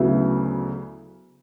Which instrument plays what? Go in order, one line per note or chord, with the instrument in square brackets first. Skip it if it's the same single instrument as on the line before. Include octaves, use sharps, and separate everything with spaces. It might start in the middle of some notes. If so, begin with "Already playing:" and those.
Already playing: [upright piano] D2 C#3 F#3 B3 E4